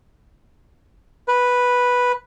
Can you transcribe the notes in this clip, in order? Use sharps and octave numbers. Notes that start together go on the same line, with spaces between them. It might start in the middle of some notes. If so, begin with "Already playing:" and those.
B4